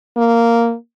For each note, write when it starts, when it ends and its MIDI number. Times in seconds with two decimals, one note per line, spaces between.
0.17 0.75 58